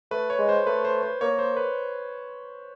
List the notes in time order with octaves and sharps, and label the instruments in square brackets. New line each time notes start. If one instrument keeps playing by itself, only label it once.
[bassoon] A3 [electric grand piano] B4
[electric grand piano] C#5
[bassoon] G#3
[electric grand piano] C5
[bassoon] A3 [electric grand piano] B4
[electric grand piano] C5
C5
[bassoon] A#3 [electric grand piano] C#5
[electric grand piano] C5
B4